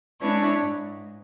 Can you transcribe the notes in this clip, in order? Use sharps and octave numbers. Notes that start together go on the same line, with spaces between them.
G#3 C#4 D4 E4 B4 C#5
G#2